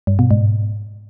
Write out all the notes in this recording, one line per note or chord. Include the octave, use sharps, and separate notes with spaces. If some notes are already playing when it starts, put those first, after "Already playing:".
G2
B2
G#2